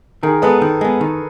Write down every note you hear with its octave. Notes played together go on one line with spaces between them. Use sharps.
D#3 G#4 A#4
G#3 B3 A4 B4
D#3
G#3 B3
D#3